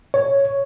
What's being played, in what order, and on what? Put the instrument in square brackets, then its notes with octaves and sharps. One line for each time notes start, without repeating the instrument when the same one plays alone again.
[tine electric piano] C#5